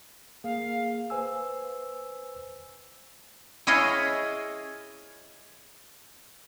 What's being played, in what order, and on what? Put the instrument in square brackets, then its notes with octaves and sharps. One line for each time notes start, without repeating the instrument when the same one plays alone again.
[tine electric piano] A#3 G#4 [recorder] F5
[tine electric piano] B4 C5 G#5 E6
[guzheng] E4 G#4 C#5 D#5 F5